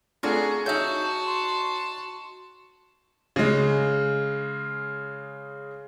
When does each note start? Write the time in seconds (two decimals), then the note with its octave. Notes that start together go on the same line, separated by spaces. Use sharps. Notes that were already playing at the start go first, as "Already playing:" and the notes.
0.23 A3 C#4 D4 F4 F#4 G#4 A#5
0.66 D#4 F#4 C#5 E5 A5 G6
1.27 C6
3.36 C#3 G#3